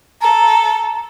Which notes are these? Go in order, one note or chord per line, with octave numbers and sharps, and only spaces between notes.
A4 A#5